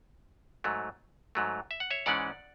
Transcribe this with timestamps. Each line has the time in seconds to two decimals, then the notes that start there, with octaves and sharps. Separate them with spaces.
0.64 G#2 F#3 A3
1.35 G#2 F#3 A3
1.71 E5
1.80 F#5
1.91 C#5 E5
2.06 G#2 E3 G#3 C#4 D5 F#5